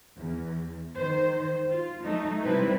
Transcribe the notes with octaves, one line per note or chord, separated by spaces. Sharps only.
E2
D#3 C5
F4
F#3 A3 D#4
C3 G3 C4 E4 B4